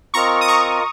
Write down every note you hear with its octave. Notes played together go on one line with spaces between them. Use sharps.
C4 F4 A#4 D#5 A#5 C#6
D#6
A#5 C#6